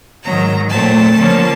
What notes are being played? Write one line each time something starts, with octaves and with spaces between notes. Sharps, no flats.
G#2 D#3 F#3 A#5
A#2 F#3 A3 C4 A5
D3 F3 A#3 C#4